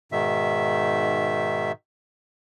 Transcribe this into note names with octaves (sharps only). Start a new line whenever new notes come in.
G#2 B2 D#3 E5